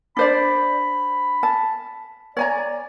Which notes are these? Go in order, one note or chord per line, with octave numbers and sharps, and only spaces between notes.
D4 C5 D5 B5
A5
C#5 D5 G#5 A#5